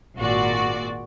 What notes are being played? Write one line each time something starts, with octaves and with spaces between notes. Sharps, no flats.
G#1 A#2 F#4 D5